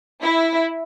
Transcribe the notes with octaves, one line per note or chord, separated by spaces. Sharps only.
E4